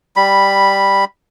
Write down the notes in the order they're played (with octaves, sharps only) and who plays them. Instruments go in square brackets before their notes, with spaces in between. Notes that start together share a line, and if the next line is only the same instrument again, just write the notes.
[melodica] G3 B5